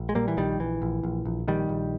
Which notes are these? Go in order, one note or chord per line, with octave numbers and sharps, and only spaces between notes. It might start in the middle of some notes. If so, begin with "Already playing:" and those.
Already playing: A#1
G#3
A#2 G3 A#3
E3
A#1 D#3 G3
A#1 E3
A#1
A#1
A#1
A#1 D#3 G3
A#1